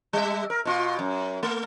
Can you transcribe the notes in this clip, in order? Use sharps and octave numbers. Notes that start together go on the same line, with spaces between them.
G3 E5
A#4
B2 F4
F#2
A3